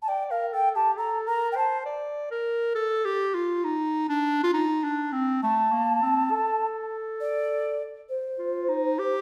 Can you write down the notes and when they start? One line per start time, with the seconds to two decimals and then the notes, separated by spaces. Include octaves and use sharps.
0.02 A5
0.08 D5 G5
0.30 A#4 F5
0.53 A4 G5
0.75 G4 A5
0.97 A4 A#5
1.27 A#4 A#5
1.52 G5
1.56 C5 A5
1.86 D5
2.31 A#4
2.75 A4
3.05 G4
3.35 F4
3.64 D#4
4.09 D4
4.43 F4
4.54 D#4
4.84 D4
5.12 C4
5.42 A3 A5
5.72 A#3
6.02 C4
6.31 A4
7.20 D5
8.09 C5
8.39 F4
8.69 D#4
8.99 G4